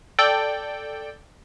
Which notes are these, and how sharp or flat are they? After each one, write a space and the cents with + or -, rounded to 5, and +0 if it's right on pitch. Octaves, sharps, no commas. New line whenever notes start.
A4 +0 D5 +0 G5 +0